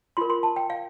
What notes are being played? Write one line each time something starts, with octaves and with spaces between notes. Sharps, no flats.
F4 A#4 C6
C6
A5
G5
F5